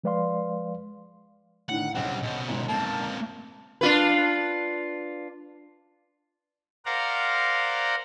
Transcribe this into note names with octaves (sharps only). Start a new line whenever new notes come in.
F3 G#3 B4 D5 F5 C6
A2 D3 D#3 F#5
B1 C#3 G3 C4 F#5
B2 C5
F#1 C#2 G#2
A#3 C4 A5
D4 F4 B4
A#4 C5 D5 F5 F#5 A#5